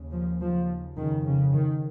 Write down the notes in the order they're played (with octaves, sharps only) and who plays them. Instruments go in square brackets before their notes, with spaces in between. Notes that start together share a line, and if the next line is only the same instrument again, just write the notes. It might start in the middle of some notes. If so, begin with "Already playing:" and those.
Already playing: [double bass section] D#2 C#3
F3
F3
F2 D#3
C#3
C#3
D#3